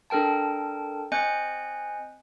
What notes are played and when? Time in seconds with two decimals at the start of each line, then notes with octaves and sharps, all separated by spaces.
0.10 D4 A4 A#4 G5 A5
1.12 C4 D#5 G#5 F#6 G6 C#7